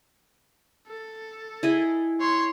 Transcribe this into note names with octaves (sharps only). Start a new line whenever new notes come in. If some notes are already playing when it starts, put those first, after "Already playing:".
A4
E4 G#4 D#5
C#5 C6